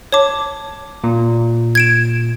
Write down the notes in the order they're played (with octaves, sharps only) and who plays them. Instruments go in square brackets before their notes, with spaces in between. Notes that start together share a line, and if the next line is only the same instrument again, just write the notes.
[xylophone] C#5 A5 D6
[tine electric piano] A#2
[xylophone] G#6 D7 E7